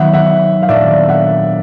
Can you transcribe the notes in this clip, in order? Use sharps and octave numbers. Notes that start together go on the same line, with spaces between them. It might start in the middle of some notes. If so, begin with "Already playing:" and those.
Already playing: D#3 F#3 B3 E5 F#5
E5 F#5
F5
A#2 F#3 A3 D4 D5 E5
E5 F#5